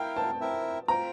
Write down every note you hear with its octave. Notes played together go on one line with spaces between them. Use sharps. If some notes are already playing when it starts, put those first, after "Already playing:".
Already playing: E4 A#4 F5 G5
A5
C4 E4 A#4 E5
F4 C5 G5 A#5